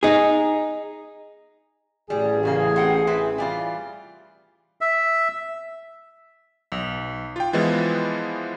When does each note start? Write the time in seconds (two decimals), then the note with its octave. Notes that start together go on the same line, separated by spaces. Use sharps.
0.03 D#4 G#4
2.10 A1 G3 G#4
2.43 A#2 C#3 A#3
2.76 C4 F#5 G5
3.07 C4 E4 B4
3.38 E3 G3 F4
4.81 E5
6.72 B1
7.36 F4 G5
7.53 E3 F3 G#3 B3 E4 F4